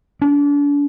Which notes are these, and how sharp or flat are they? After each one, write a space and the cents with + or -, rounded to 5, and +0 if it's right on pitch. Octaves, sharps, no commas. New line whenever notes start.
D4 -35